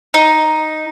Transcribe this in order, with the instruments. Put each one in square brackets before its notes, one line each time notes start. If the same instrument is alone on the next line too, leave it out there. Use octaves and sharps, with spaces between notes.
[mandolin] D#4